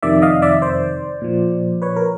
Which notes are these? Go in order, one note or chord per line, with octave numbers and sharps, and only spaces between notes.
F2 C3 D#3 D5 E5
D#5 F5
D5 E5
C5 D5
A#2 F3
B4 C#5
A#4